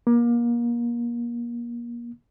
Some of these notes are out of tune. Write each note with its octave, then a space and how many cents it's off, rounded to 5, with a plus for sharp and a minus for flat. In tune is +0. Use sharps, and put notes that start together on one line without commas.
A#3 +30